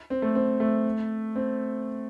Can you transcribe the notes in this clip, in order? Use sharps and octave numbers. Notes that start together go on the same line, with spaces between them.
C4
A3
C4
A3
C4